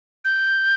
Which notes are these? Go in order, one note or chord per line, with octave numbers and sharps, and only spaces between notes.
G6